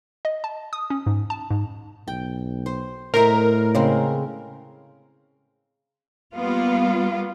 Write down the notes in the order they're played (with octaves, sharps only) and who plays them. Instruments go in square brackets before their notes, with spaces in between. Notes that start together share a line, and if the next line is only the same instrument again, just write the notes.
[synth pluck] D#5
A5
D#6
C#4
G#2
A5
G#2
[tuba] B1 [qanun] G5
[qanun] C5
[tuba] A2 [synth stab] A#4 [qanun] C5 D#5 E5
[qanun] C#3 G#3 C4
[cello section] G3 A#3 B3 F4